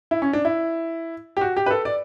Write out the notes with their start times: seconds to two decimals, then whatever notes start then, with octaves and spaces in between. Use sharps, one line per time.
0.11 E4
0.22 C#4
0.33 D4
0.45 E4
1.37 G4
1.41 F#4
1.57 G4
1.66 B4
1.71 A4
1.85 D5